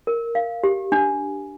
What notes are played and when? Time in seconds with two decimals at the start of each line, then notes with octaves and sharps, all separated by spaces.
0.07 A#4
0.35 F5
0.64 G4
0.92 D4